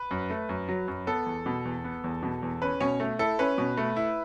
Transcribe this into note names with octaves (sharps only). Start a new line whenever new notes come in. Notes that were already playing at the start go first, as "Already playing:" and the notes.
Already playing: B4
F#2
A3
F#2
F#3
F#2
B3 A4
E2
B2
E2
B3
E2
B2
E2
C#4 B4
B2 C#4 C#5
A3
E4 A4
C#4 B4
B2
A3
E4